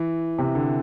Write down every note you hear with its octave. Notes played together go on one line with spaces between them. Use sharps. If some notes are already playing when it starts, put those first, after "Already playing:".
Already playing: E3
C3
D3